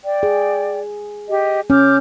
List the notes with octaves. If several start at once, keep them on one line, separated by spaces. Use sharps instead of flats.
D5 G5
G#4
G4 D#5
C#4 D6 F6 G6